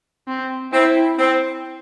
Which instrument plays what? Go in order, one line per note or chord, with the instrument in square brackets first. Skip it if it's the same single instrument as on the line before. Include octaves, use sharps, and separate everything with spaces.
[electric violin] C4
[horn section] C4 [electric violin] E4
[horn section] C4